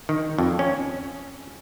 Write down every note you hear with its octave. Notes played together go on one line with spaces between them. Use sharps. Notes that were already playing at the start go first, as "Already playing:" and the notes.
D#3
F2
C#4